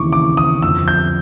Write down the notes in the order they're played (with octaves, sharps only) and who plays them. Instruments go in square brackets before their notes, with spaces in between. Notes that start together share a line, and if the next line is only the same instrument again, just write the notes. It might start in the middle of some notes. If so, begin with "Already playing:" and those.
Already playing: [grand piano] D#2 C#3 E3 C#6 D6
D6
D#6
F2 D3 E6
G6